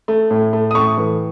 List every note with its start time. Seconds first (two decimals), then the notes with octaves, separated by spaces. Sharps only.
0.08 A3
0.31 A2
0.53 A3
0.71 D#6
0.75 A2 C#6
0.98 E3